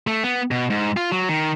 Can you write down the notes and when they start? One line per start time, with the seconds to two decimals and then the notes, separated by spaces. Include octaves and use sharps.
0.07 A3
0.24 B3
0.51 B2
0.70 G#2
0.97 F4
1.12 F#3
1.29 D#3